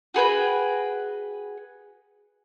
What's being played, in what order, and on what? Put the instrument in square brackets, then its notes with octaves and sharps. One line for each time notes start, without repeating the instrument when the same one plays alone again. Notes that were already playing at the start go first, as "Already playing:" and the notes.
[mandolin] F#4 G#4 B4 G5